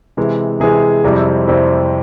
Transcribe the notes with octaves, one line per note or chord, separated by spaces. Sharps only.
C3 E3 G#3
C3 E3 G#3 G#4
F2 C3 G3 C4 E4
F2 C3 G3 C4 E4